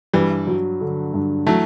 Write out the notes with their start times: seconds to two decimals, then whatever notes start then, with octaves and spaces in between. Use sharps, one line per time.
0.13 G2 E3 G3
0.47 F#3
0.81 D3
1.14 G2
1.46 E3 F#3 A3